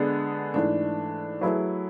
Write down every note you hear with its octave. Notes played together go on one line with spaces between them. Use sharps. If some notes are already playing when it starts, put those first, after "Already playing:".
Already playing: D3 G#3 B3 D4 G#4
G#2 E3 A3 D4
F#3 A3 E4 G#4 B4